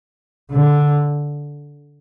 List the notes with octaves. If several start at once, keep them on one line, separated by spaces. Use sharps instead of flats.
D3